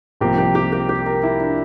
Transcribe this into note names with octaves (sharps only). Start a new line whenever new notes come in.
C2 C3 F3 A#3 G4
G4
G4
G4
G4
A#4
E4
D4